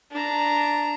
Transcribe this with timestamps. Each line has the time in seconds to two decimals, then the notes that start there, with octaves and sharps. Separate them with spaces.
0.12 D4 A#5